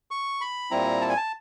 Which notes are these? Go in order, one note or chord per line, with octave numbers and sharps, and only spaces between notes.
C#6
B5
A#2 G3 C4 E4 A#5
A5
G#5
A5